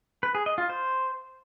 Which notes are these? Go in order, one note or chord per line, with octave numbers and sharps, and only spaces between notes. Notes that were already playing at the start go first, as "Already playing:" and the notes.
B4
G#4
D#5
F4
C5